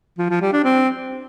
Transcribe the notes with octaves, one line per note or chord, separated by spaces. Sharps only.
F3
F3
G3
D4
C4